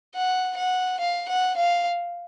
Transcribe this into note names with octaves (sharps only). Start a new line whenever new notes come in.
F#5
F#5
F5
F#5
F5